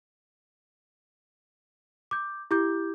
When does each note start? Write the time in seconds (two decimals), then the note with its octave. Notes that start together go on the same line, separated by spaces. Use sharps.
2.11 D6 G6
2.51 E4 G4 D6 G6